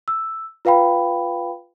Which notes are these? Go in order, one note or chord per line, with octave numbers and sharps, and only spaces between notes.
E6
F4 B4 F5 G5 B5